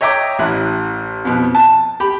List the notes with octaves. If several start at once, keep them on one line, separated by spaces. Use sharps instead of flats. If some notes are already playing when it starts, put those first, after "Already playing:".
C#5 D#5 E5 G5 A#5 D6
A1 E4 F#6
F2 B2
A5
G4 B5